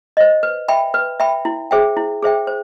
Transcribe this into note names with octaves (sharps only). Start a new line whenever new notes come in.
C5 D#5
B4
E5 G5 B5
B4
E5 G5 B5
E4
G#4 C5 E5 G5
E4
G#4 C5 E5 G5
C5